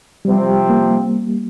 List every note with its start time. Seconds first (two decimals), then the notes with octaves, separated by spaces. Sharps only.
0.25 C3 F3 G3 C4
0.69 A#3